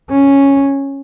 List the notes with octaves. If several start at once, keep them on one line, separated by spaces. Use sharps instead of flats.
C#4